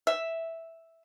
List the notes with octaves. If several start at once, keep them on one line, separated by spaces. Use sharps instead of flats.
E5